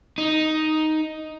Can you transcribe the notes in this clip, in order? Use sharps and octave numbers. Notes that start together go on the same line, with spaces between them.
D#4